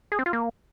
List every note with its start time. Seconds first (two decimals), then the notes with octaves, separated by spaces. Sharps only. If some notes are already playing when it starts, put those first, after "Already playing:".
0.12 G#4
0.19 C4
0.26 F4
0.33 A#3